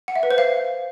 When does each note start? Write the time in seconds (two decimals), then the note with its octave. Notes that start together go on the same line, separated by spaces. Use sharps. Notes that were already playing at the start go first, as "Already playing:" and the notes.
0.08 F#5
0.16 E5
0.23 B4
0.31 C5
0.38 F5